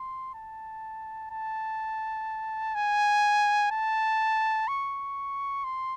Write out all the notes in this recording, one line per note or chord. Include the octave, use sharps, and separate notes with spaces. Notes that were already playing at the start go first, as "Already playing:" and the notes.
Already playing: C6
A5
A5
G#5
A5
C#6
C6